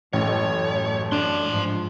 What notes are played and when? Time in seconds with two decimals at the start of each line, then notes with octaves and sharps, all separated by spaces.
0.13 A1 F#2 A3 C#5
1.12 D4 A5 C6
1.50 G#2 F3